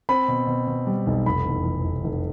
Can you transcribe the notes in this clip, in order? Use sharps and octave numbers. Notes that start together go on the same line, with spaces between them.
C4 B5
B2
B2
B2
G3
B1
F1 B5
E2
F1
F1
F1